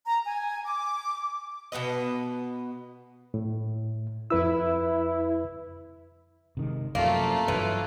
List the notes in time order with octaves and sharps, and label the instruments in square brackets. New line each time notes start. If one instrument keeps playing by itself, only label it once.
[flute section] A#5
G#5
D6
[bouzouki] B2 B3 B4 D#5
[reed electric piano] A2
[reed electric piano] F2 B4 E6 [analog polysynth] E4
[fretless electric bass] C3 D#3 G#3
[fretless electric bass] F#2 C3 F3 [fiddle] A3 F4 [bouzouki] A#3
[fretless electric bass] G2 F#3 [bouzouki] E3